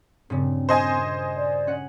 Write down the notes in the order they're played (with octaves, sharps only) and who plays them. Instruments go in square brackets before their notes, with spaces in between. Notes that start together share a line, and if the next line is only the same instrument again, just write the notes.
[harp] G2 A#2 C#3 [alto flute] C4
[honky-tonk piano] C5 D#5 G#5
[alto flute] D5
[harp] C#4 F#5